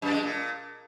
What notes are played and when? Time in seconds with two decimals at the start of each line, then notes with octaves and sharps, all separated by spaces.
0.02 F#2
0.13 G#3
0.23 A#2